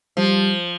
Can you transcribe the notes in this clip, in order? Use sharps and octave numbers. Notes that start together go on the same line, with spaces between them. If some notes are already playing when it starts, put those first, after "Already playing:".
F3 G3